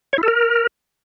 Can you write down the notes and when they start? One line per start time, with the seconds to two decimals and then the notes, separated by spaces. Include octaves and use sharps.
0.13 C#5
0.18 E4
0.23 A4
0.28 A#4